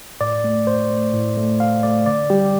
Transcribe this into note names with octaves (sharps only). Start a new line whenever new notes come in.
A2 D5
A3
A2 C5
A3
A2
A3
A2 F5
A3 D5
D3 D5
G3 G4